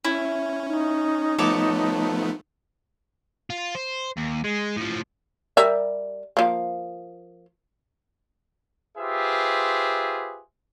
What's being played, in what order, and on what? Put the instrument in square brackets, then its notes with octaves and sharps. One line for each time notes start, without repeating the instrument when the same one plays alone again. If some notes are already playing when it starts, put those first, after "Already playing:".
[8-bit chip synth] C#4 [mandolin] E4
[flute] D#4
[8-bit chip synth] F3 A3 B3 [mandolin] A4 C#5 D6
[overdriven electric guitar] F4
C5
D#2
G#3
A2 F3
[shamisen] G3 A#4 E5
F3 A#3
[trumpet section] F4 G4 G#4 B4 C5 E5